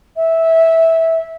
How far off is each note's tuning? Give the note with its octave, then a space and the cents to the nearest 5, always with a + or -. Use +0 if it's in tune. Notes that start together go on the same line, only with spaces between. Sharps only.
E5 -15